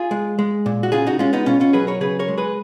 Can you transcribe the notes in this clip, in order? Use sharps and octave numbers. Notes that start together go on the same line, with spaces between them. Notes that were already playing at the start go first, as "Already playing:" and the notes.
Already playing: F4 G#4
G#3
G#3
A#2
F#4
C#3 F4 G#4
D#4 F#4
G#3 C#4 F4
B3 D#4
B2 C#4 F4
C#4 F4
F#3 G#4 B4
A#4 C#5
C#3 G#4 B4
A#4 C#5
G#3
G#4 B4